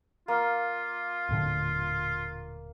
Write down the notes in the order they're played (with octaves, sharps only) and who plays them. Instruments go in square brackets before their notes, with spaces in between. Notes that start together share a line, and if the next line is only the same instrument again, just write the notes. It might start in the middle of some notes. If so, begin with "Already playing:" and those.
[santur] A#3 [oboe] F4
[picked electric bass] D#1 A2 D3